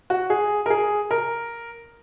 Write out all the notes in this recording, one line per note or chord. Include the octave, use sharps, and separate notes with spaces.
F#4
G#4
A#4
G#4
A#4